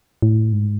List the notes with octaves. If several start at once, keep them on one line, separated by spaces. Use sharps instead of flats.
A2
G#2